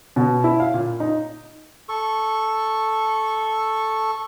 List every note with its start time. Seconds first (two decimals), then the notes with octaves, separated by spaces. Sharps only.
0.16 B2
0.44 E4
0.60 F5
0.74 A#2
1.00 D#4
1.89 A4 C#6